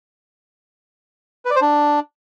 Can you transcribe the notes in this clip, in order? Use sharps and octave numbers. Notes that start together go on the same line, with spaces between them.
B4
D5
C5
D4